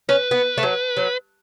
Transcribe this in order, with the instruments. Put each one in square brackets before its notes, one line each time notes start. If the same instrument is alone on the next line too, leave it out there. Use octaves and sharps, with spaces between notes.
[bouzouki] C#4 [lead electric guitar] B4
[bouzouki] B3
A3
F#3
F#3